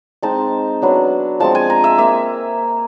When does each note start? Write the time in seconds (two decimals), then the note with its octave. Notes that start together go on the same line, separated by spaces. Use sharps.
0.22 G#3 C4 D#4 A5
0.82 F#3 B3 D4
1.40 F3 G#3 C4 A5
1.55 G#5
1.70 A#5
1.84 E5
1.98 A#3 E5